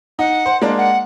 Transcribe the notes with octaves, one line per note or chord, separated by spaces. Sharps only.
D#4 F#5
C5
G#3 A#3 D4
F#5